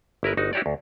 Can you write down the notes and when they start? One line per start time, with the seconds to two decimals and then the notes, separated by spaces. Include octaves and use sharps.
0.23 G1 E4 A#4 B4
0.37 G1 D#4 F#4
0.53 E4 F#4 G4 C#5 D5
0.66 D2